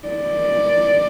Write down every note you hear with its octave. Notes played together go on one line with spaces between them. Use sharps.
D5